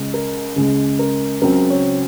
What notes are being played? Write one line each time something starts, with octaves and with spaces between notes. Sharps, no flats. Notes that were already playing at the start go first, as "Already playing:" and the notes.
Already playing: C#2 C#3 G#3
A#4
C#2 C#3 G#3 G#4
A#4
C#2 C#3 F#3 C4 A#4
C#5